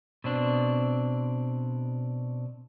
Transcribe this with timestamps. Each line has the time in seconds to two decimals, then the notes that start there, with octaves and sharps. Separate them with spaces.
0.24 B2 C4 D4